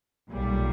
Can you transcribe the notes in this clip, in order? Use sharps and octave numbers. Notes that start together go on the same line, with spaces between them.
B1 A#2 G3